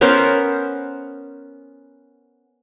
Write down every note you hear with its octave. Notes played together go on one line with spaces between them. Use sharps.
B3 C#4 A#4 C5